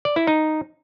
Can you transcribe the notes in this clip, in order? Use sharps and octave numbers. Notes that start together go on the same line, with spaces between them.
D5
E4
D#4